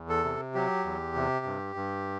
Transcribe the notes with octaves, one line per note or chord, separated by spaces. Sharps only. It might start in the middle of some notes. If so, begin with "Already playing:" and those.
Already playing: E2
A4
C3
F#3 G4
E2
C3
G2
G2